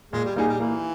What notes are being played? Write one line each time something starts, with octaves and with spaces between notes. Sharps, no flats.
A#2 G#3
G3
G3 A#3 D#4 G#4
G3
E3 A#3